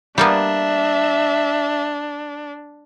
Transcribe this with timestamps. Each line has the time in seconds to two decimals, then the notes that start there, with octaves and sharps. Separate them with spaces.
0.18 G3 A#3 B3 D4 E5